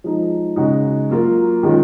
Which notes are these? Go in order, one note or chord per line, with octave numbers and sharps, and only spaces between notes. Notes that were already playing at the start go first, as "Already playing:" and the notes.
F3 G#3 D#4
C#3 G#3 D#4 F#4
F#3 A#3 F4
D#3 G#3 C#4 F4